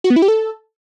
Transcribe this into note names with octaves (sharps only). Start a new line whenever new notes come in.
F#4
B3
E4
G4
A4